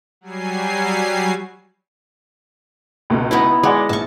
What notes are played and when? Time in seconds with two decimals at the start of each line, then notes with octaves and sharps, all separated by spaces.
0.21 F#3 G3 G#5 C7
3.10 C#2 B2 A3
3.31 B3 D#4 E4
3.64 G#3 D5 F#5 D6
3.89 A#1 A5 C#6